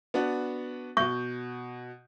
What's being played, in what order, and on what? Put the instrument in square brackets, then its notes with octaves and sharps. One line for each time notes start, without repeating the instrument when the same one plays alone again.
[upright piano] B3 D4 F#4
[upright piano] B2 G6 [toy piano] C#6